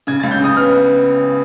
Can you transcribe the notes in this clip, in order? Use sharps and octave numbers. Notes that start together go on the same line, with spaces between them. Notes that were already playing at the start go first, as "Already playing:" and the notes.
C#3 G#6
C#2 A6
G6
C#3 D#6
B3 F6